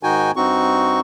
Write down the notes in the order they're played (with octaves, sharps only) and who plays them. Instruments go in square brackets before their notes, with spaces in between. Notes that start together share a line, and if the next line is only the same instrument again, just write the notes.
[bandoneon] G#2 D#3 D#4 F#4 G5 G#5
G2 C4 D#4 F#4 C#6